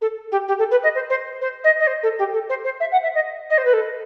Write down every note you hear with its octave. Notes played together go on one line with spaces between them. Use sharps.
A4
G4
G4
A4
B4
D#5
C5
C5
C5
D#5
D#5
C5
A4
G4
A4
C5
C5
E5
F#5
E5
D#5
D#5
C5
B4
A4